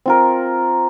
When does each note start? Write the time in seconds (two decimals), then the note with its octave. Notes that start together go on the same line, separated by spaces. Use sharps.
0.06 C4 F4 A#4